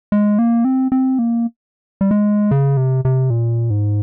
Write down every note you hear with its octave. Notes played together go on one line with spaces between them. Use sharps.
G#3
A#3
C4
C4
A#3
G3
G#3
C#3
C3
C3
A#2
G#2